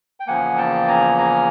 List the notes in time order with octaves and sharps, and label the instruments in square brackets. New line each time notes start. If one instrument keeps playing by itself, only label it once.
[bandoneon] G5
E2 C#3 F3 A#3 F#5 G#5
G5 A5
G#5 A#5
G#5 A#5